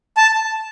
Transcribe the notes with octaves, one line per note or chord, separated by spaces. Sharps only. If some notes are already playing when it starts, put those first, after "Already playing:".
A5